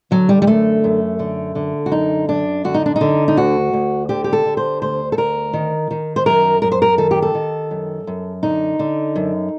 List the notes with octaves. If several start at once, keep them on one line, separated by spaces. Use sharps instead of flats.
D3 F#3
G3
G3
F#2 A3
F#2
D3
D3
F#4
F#2 D#4
F#2 D4
D3 F#4
D#4
D4
D#4
D3
D#4
D2 F#4
D2
D3 G4
G4
A4
D3
C5
D2 C5
A4
D2 A#4
D#3
D#3
C5
F#2 A#4
F#2 A#4
C5
A#4
D#3 A4
G4
A4
D#3
F#2
F#2
D3 D#4
D3
F#2